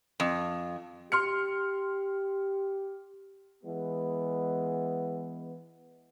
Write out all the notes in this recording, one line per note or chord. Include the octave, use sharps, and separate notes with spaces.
F2
G4 C6 F6 C#7
E3 G#3 B3